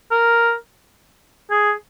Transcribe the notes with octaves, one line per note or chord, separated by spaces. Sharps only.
A#4
G#4